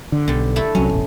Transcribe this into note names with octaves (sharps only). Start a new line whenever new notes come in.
D3
B1 D3 G3
A3 E4 A4
C2 F#3 C#4
E1 A1